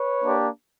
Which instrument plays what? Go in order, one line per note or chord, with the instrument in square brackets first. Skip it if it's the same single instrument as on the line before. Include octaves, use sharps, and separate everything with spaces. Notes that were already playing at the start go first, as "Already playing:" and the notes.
Already playing: [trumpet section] B4 C#5
A#3 D4 G4